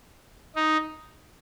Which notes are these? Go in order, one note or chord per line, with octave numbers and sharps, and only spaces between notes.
D#4